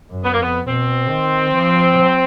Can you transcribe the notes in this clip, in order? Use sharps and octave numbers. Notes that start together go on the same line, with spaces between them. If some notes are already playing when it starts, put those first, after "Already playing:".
F#2
B3
A#3
F2 B3
B2 C4
D#3
F3